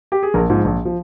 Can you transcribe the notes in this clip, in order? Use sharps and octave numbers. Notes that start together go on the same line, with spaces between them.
G4
G#4
A#1 A#4
G#2 F3
A#1
F3